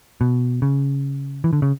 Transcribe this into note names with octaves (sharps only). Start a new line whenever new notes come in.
B2
C#3
E3
D3
C#3